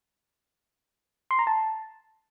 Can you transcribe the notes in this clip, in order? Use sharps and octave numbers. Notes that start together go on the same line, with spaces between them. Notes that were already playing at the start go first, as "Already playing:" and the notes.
C6
A#5
A5